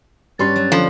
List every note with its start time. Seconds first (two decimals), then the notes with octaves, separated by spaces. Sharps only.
0.39 G2 C#4 G4 B4 C6 A6
0.56 F#3 B4
0.72 D3 F3 G3 B3